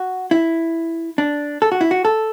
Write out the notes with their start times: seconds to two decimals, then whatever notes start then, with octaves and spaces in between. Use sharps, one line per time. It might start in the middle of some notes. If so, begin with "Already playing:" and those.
Already playing: F#4
0.31 E4
1.18 D4
1.62 A4
1.72 F#4
1.81 E4
1.91 F#4
2.05 A4